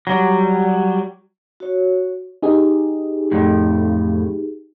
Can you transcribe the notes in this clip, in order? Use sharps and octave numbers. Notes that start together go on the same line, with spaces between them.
F#3 G3
F#4 C#5
D#4 G4 G#4
F2 A2